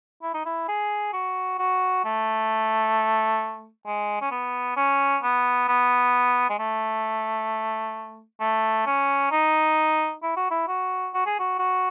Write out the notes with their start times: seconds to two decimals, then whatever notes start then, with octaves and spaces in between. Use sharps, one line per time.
0.22 E4
0.34 D#4
0.45 E4
0.68 G#4
1.13 F#4
1.59 F#4
2.05 A3
3.86 G#3
4.21 C#4
4.31 B3
4.76 C#4
5.23 B3
5.68 B3
6.49 G#3
6.59 A3
8.41 A3
8.86 C#4
9.31 D#4
10.23 E4
10.36 F#4
10.51 E4
10.68 F#4
11.14 F#4
11.26 G#4
11.39 F#4
11.59 F#4